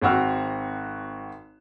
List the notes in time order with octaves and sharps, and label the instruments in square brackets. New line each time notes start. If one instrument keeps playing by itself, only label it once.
[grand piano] G#1 C4 F#4 E6 F6